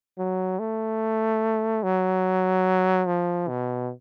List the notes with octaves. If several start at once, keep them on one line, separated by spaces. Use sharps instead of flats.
F#3
A3
F#3
F3
B2